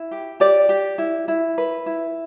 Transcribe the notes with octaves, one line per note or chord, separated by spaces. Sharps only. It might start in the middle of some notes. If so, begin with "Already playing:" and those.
Already playing: E4
G4
G4 D5
G4
E4
E4
B4
E4